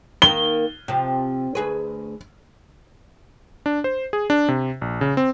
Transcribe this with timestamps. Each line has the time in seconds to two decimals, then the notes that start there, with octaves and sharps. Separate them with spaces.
0.22 D#3 A#3 A#4 G7
0.88 C3 F3
1.55 D2 G#4 B4
3.66 D4
3.84 C5
4.13 G#4
4.30 D4
4.48 C3
4.81 A#1
5.01 C#3
5.17 C4